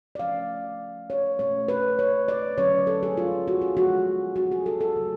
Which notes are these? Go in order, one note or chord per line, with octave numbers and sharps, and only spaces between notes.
D5
F3 A3 C#4 F5
C#5
B2 A3 C#4 C#5
B4
C#5
D5
D3 F#3 C#4 C#5
A4
G#4
F4
F#4
G#4
F3 G#3 B3 F#4
F#4
G#4
A4
A4
C#3 F#3 A3